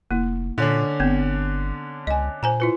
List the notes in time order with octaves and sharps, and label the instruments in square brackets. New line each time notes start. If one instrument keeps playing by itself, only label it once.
[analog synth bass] F1 [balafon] A#3 E4
[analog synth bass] A#2 [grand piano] D3 C#4 D4
[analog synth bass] G1 [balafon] B3 C4
[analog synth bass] C#2 [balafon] D#5 G#5
[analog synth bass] A#2 [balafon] C5 G#5 A#5
[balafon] E4 F4 B4